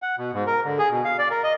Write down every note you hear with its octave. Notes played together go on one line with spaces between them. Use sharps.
F#5
B2
G#2
A#4
D3
G#4
B2
F5
D5
A#4
D#5